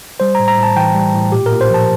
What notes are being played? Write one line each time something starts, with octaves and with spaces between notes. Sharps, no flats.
G3 C5
A#5
A2
A#5
A2
A5
E3 G5
G3
A2
A#2 G4
A#4
A#2
C5
F3 A5